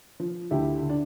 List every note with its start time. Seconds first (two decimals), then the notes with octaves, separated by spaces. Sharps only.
0.20 F3
0.51 D2 E4 G4
0.82 D3
0.89 D4